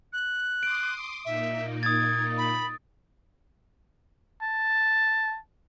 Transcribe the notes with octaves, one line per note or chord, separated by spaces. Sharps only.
F#6
C6 D6 D#6 D7
A#2 A#3 D#4 E5
D#6 G#6 A6
B5
A5